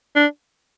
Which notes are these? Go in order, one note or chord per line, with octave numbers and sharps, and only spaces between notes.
D4